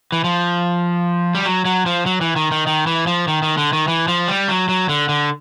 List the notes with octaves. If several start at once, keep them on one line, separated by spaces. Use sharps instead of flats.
E3
F3
G3
F#3
F#3
F3
F#3
E3
D#3
D#3
D#3
E3
F3
D#3
D#3
D3
D#3
E3
F3
G3
F#3
F#3
D3
D3